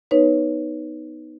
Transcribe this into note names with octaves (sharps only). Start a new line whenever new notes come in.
B3 D#4 B4 C#5